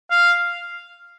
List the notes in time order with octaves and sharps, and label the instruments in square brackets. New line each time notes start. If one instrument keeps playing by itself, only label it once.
[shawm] F5